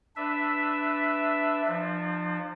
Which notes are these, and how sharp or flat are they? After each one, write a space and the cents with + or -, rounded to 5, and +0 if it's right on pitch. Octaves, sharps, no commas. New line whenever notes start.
D4 +0 B4 +10 E5 +0
F3 +0 D4 +45